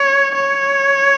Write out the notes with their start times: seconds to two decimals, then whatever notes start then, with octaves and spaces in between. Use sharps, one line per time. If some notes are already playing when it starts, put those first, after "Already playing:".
Already playing: C#5
0.35 C#5